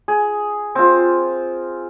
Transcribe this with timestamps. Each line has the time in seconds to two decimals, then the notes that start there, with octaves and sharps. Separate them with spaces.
0.08 G#4
0.75 C4 F4